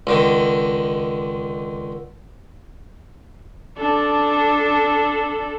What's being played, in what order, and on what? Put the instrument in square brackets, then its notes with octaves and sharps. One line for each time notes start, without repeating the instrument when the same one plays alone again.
[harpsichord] C#2 D3 D#3
[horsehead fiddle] D4 A4